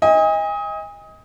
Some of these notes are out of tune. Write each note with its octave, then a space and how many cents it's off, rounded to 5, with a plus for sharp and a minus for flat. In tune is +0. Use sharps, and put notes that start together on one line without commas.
D#5 +25 G#5 -40